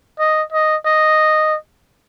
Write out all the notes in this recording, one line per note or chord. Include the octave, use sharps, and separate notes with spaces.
D#5
D#5
D#5